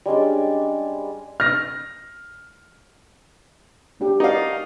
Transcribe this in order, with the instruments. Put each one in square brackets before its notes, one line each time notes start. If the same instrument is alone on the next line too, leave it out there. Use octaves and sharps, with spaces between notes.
[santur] G3 G#3 C#4 D4
[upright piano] F6 A#6
[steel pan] C#4 D4 G4
[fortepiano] D#4 F5 [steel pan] F#4 A#4 D5